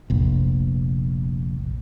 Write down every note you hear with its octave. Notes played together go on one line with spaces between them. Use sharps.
F1 A#1